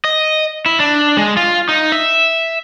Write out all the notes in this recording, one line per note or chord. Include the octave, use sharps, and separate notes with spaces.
D#5
E4
D4
G#3
F4
D#4
E5